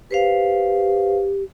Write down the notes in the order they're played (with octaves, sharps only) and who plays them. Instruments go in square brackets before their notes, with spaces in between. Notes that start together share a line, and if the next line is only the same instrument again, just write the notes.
[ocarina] G4 [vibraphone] B4 C5 F5